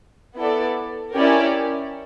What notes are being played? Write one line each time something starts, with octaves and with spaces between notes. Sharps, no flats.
B3 E4 A4 D5
C#4 E4 G4 A#4 D5